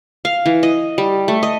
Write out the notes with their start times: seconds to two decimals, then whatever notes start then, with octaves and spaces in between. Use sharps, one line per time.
0.25 F5
0.46 E3
0.63 D#5
0.98 G3
1.28 A3
1.43 D#5